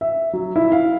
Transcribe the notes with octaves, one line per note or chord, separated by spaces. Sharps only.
E5
F#3
E4
F5